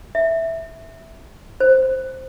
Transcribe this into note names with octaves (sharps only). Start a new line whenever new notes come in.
E5
C5